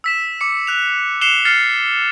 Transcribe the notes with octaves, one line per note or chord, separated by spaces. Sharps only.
E6 B6 E7
D6 C#7
F#6 F7
F#6 C7 C#7 E7 F7 G7
F6 A6 C7 C#7 G7